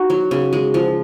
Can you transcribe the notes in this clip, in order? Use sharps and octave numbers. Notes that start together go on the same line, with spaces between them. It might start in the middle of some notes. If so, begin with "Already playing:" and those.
Already playing: D#4 F#4
F#3
C#3
G#3
F3